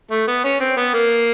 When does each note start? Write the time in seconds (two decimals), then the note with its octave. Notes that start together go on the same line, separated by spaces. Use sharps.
0.11 A3
0.27 B3
0.44 C#4
0.60 C4
0.77 B3
0.94 A#3